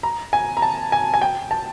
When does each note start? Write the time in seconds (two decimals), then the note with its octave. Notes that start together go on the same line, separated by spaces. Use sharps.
0.03 A#5
0.33 G#5
0.57 A#5
0.62 A5
0.92 G#5
1.14 G#5
1.22 G5
1.51 A5